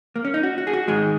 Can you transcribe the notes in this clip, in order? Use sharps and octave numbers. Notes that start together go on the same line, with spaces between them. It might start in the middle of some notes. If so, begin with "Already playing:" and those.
A#3
C#4
D#4
F#4
F#4
G#4
F#4
G#2 D#3 G#3 G#4